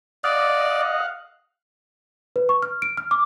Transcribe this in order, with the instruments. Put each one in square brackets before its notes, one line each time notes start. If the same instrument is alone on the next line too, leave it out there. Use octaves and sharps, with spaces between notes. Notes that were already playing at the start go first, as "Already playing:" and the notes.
[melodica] D5 [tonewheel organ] D#5 [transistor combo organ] F5 F#5
[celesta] B4
C#6
F6
D7
F6
D6